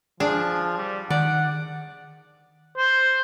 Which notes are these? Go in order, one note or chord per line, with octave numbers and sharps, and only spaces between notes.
F3 D4 G#4
G3
D#3 D5 F#5
C5